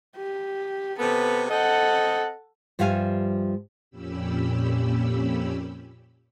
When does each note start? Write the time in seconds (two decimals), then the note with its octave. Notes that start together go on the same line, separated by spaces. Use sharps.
0.17 G4
0.99 C3 B3 A4
1.49 C4 A4 D#5 F#5
2.79 G2 F3 G3 E5 F5 G#5
3.90 F2 A#2 C#4 G4 B5 E6